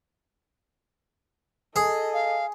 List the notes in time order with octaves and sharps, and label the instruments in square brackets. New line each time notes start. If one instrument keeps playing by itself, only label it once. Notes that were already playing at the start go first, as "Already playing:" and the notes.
[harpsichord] G#4 [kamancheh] A4 D#5
[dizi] F5